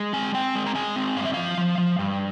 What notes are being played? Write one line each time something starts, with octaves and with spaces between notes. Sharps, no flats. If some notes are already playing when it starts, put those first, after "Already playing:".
Already playing: G#3
C4 G#5
C4 G5
G#3
A#5
G#3 G#5
C4
G2 F5
E5
F3 F5
F3
F3
G2